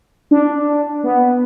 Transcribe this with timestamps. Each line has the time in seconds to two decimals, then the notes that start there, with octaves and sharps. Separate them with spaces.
0.31 D4
1.04 B3